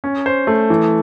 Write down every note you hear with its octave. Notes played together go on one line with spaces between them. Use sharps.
C#4
C5
A3
E3